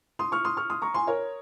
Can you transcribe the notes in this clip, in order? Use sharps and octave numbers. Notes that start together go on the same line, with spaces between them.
C6 D#6
C#6 F6
C6 D#6
C#6 F6
C6 D#6
A#5 C#6
G#5 C6
A#4 C#5